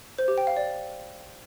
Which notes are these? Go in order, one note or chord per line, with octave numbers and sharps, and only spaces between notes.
C5
G4
G5
F5
D5